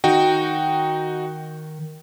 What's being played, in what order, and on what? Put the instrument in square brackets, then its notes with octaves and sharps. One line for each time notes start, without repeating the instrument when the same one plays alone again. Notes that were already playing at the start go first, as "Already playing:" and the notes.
[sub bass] D#3 [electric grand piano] D#4 F#4 G5